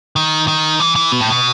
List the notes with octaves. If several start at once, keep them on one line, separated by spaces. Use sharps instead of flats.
D#3
D#3
E3
E3
B2
A2
B2